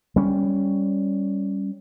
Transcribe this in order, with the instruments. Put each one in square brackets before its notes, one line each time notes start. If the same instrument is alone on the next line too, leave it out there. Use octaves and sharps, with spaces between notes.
[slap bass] G3 C#4